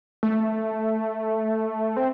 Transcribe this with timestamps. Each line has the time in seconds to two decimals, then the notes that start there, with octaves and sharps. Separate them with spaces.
0.23 A3
1.97 C4